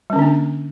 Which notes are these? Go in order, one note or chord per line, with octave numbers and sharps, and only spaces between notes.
D3 G3 A#3 C#4 D4